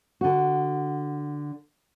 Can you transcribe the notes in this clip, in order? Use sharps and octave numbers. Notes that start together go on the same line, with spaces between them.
D3 F#4